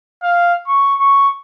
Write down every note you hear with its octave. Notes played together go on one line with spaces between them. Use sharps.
F5
C#6
C#6